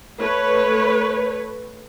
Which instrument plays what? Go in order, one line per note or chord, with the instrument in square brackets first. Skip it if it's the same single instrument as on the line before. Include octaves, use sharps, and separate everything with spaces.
[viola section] A3 B4 C#5